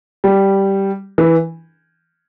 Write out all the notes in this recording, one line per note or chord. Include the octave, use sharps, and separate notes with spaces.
G3
E3